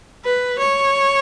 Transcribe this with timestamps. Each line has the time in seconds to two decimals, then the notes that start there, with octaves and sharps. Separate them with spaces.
0.25 B4
0.59 C#5